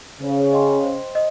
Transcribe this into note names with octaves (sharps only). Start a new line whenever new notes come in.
C#3 C5
D#5 G5 C6
C5
D#5